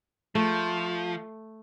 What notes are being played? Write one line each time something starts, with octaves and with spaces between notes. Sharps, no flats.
F3 A3